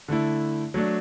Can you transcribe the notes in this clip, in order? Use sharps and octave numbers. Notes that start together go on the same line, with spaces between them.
D3 A3 E4
F#3 A3 D4